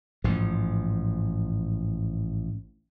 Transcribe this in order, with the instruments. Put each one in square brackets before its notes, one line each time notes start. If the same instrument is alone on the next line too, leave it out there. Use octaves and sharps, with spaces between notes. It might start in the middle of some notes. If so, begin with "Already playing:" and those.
[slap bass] A1 G#2 F3